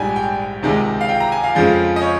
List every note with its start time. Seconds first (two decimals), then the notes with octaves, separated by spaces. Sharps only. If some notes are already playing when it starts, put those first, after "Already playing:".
Already playing: A#1 G#2 G3 G5 G#5
0.16 G5
0.62 C#2 C3 D#3 G#3
1.01 F5
1.09 G5
1.20 A#5
1.32 G#5
1.44 F5
1.55 F2 C#3 F3 G#3
1.96 D#5
2.02 C#5